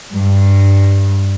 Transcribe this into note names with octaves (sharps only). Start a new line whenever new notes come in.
G2